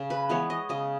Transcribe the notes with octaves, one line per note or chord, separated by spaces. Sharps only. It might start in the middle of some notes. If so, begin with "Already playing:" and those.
Already playing: C#3
B4
E3 G#3 B3 C#5
D#5
C#3 D#5